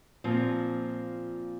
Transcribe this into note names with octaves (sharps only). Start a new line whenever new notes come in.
A#2 F3 C4